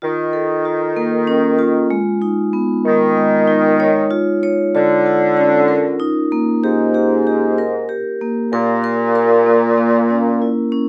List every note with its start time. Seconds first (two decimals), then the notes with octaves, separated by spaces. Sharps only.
0.02 D#3 F4
0.33 A4
0.65 F4
0.96 A#3
1.27 C#4
1.59 F4
1.90 G#3
2.22 D#4
2.53 B3
2.85 D#3 G#3
3.17 G#3
3.48 D#4
3.80 C#5
4.11 F4
4.43 C#5
4.74 D3 F4
5.06 F4
5.37 C#4
5.68 A#4
6.00 D#4
6.32 A#3
6.64 G#2 G4
6.94 G4
7.27 G4
7.58 A#4
7.89 G4
8.21 A#3
8.52 A#2 A#4
8.84 A#4
9.15 A#4
9.46 A#3
9.78 A#3
10.10 C#4
10.42 E4
10.72 C#4